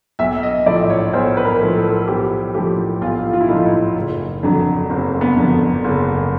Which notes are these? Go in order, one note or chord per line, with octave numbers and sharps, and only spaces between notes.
B1 E5
D#5
A2 F3 D5
C#5
B1 C5
B4
A#4
A2 F3
A4
B1 G4
A2 F3 G4
B1 F4
F4
E4
A2 F3 D#4
E4
D#4
F#1
F2 D3 F#3 D4
F#1 C4
B3
F2 D3 F#3
F#1